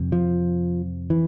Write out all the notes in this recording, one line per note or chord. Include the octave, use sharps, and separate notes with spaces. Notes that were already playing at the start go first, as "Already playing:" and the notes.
Already playing: F2 C3
F3
E3